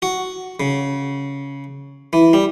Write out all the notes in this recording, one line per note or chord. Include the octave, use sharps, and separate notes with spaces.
F#4
C#3
E3
G3